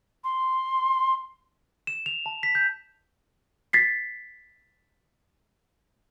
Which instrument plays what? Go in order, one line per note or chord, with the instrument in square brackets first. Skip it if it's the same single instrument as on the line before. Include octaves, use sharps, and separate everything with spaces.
[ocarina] C6
[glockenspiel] E7
F7
A5
B6
G6
[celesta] A6 B6 C7